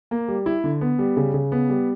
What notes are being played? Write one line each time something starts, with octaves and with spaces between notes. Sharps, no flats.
A#3
G3
E4
D3
B3
G3
C#3
C#3
B3
G3